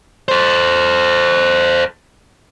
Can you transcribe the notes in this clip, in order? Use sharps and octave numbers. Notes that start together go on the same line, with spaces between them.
A4 C5